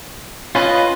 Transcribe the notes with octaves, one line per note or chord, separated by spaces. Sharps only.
C#4 F4 B4 D#5